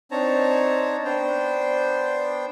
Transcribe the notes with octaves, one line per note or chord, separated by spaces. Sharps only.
C4 D4 D#4 C#5 A5 A#5
B3 D4 C5 G5